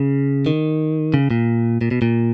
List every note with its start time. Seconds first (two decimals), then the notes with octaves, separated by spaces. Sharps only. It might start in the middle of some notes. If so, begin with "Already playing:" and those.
Already playing: C#3
0.46 D#3
1.14 C#3
1.31 A#2
1.81 A#2
1.91 B2
2.02 A#2